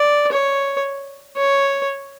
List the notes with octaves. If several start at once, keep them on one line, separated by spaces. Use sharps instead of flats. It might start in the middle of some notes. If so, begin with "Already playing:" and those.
Already playing: D5
C#5
C#5